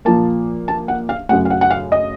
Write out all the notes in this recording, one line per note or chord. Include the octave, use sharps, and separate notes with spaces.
A#2 F3 A#3 A5
A5
F#5
F5
F#2 C#3 A3 F#5
F5
F#5
F#5
F5
D#5